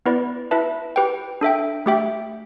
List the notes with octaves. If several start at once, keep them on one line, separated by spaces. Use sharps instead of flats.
B3 E4 B4 D5
E4 B4 E5 A5
G4 B4 G5
D4 A4 E5 G5
A3 G4 E5 G5